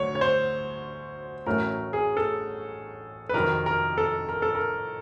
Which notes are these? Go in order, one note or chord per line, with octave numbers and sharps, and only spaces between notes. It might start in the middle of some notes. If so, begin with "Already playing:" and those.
Already playing: D2 D3 F#3 C#5
C#5
C5
A1 A2 F#3 A3 C#4 A#4
G#4
A4
B4
F2 C3 D#3 F#3 A#4
A#4
A4
A#4
A4
A#4